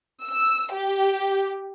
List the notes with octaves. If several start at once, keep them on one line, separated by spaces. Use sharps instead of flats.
E6
G4